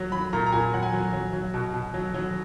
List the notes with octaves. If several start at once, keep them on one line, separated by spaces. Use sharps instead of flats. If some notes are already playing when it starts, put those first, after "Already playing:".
Already playing: F#3
F#3 B5
A#2 A#5
A#5
A#2 G#5
F#3 F#5
G#5
F#3
F#3
F#3
B2
B2
F#3
F#3